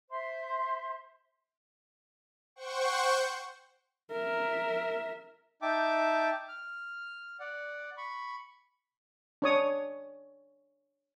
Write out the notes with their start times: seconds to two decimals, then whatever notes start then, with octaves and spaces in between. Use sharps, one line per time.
0.10 C5 E5 C6
2.56 C5 F#5 G5 C#6
4.12 A#4 E5
5.62 D#4 E5 G5 A5 D6
6.48 F6
7.40 D5 F#5
7.97 B5 C#6
9.42 D4 C#5 D#6